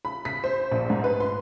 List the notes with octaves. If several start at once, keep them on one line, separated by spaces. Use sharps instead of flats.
B5
B6
C5
A#1
G#2
B4
C6